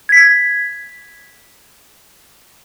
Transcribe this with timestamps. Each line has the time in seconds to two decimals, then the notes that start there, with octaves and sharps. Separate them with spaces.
0.09 G#6 B6